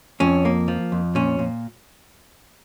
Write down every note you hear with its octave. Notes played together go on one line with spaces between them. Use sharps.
F2 C#4
A#3
F3
F2
A#2 C#4
A#2